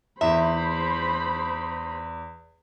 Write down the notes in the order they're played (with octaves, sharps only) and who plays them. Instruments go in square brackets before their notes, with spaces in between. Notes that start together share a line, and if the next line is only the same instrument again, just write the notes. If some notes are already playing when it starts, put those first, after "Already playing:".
[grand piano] E2 [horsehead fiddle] C5 B5 [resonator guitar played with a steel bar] E5